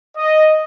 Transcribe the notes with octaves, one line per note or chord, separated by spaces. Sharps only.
D#5